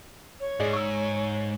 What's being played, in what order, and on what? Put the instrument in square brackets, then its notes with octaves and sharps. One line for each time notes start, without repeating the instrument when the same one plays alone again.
[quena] C#5
[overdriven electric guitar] G#2 [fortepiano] G#3 D5
[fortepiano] C#6 E6